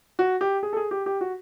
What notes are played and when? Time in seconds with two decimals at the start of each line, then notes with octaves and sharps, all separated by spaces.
0.19 F#4
0.41 G4
0.63 G#4
0.73 A4
0.77 G#4
0.91 G4
1.06 G4
1.21 F#4